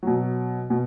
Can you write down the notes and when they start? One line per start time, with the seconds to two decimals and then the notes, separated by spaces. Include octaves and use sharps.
0.03 B2 F#3
0.70 B2